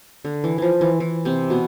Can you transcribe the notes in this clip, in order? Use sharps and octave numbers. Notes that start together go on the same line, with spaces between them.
D3
E3
E3 F3
E3
E3
C3 C4
B2 B3